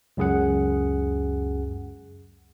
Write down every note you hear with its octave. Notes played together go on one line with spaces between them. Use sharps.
C#2 F#2 G#4 F#5